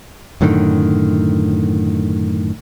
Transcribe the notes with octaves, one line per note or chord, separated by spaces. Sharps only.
F#2 A2 D3 D#3